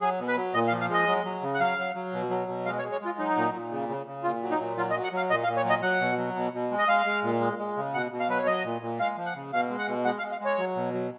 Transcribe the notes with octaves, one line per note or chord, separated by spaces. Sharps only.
F#3 G#4
B2
B4
F#3
A#2 D#5
F5
F3
F5
G#3 D#5
F#3
F#3
C#3
F#5
F#3 F5
F#3
F#3
B2
F#3
B2
G#3 F5
C#5
G#3
C#5
G#3 F4
F#3 D#4
A#2
A#2
C#3
C#3
C#3
A#2 F4
F#3
D#4
A#2
F#3 F4
D#5
F#3
F#5
F#3 F5
A#2 D#5
F5
A#2
C#5
F#3
D#5
F#3 F#5
B2
F#3
B2
B2
G#3
D#5
G#3 F5
G#3
A#2
G#3
G#3
C#3
B2 F#5
B2
F5
F#3 B4
C#5
F#3 D#5
A#2
A#2
G#3 F5
F3
F#5
C#3
B2 F5
G#3
F#5
B2
G#3 F#5
F5
G#3
F5
G#3 C#5
F#3
B2
F#3